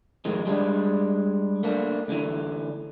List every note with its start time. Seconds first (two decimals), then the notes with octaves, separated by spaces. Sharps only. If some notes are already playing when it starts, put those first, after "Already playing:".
0.25 F2 A2 D#3 G#3
0.46 G3 G#3 C4 D4
1.63 A3 A#3 D4
2.08 D2 D3 E3